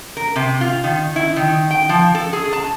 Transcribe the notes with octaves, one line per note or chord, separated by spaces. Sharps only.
A#4
C3
F4
D#3
E4
D#3
G5
F3
A4
G#4
A5